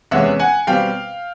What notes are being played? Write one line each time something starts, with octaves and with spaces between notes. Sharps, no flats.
E2 C3 E3 G#3 C#4 E5 F#5
F#5 G#5
B2 G3 C4 F5 G5